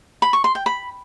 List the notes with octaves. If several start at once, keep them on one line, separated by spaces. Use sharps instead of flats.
B5
C#6
C6
G5
B5